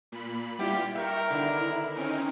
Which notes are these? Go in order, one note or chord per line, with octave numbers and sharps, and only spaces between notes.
A#2 B5
G3 B3 E4 F4 G4
A#4 E5 G5 C#6
D3 D#3 B3 E4
C4 C#4 D#4 A#4